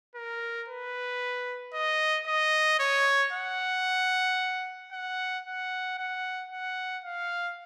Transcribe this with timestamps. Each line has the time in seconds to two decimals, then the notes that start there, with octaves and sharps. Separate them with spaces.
0.15 A#4
0.68 B4
1.74 D#5
2.27 D#5
2.79 C#5
3.32 F#5
4.92 F#5
5.45 F#5
5.98 F#5
6.51 F#5
7.04 F5